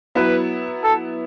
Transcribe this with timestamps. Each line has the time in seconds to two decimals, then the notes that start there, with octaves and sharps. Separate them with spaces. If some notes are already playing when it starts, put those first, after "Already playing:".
0.15 F#3 B3 E4 B4
0.83 A4